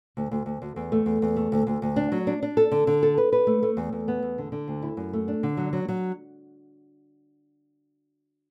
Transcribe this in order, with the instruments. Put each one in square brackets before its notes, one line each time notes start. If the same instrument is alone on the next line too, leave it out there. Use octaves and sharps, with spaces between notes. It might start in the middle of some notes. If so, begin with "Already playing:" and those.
[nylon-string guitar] D2
D2
D2
D2
E2
A3
E2
E2
A3
D2
D2
D2
D4
F#3
D4
D4
A4
D3
D3
A4
B4
B4
A3
A3
E2
E2
B3
E2
D3
D3
D2
E4
F#2
A3
D4
D3
F#3
F#3
F#3